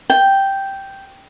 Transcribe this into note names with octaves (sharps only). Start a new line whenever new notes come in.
G5